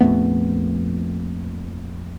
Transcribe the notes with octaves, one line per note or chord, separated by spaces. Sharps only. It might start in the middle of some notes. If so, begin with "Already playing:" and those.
A#1 F2 A3 B3